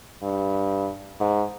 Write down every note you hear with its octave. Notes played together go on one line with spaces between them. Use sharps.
G2
G#2